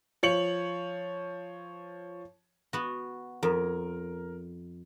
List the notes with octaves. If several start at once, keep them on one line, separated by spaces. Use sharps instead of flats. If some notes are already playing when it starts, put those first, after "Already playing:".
F3 C#5 C#7 F#7
B3 F#4
F2 A#4